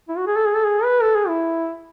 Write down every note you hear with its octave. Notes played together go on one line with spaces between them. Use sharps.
E4
F#4
G#4
A4
G#4
A4
G#4
B4
A4
G#4
E4